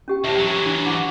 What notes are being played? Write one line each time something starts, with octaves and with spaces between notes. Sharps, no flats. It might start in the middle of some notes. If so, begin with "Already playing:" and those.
C#4 G4 G5
D2 A2 C#5 E5
E3 F#3
D4 E4
E4 F#5 D6